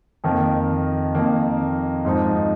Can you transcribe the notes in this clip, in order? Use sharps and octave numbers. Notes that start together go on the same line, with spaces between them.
F2 D#3 A#3
F2 D#3 A#3
G#2 F3 C4 D#4